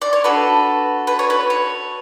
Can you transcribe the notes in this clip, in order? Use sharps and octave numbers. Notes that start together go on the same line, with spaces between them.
D5
C#5
D4 F#4 A4 B4
B4
C#5
B4
C#5